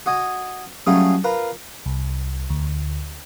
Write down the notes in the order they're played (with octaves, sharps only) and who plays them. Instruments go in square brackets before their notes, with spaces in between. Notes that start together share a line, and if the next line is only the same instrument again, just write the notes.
[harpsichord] F#4 D#5 G#5
F#3 G3 A3 C#4 F4 G#4
F4 A#4 B4
[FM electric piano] C2
D2